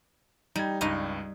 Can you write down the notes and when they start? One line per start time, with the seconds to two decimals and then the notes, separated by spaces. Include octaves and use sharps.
0.56 G3 D#4 G#6
0.81 C#2 G2 D#4 D#5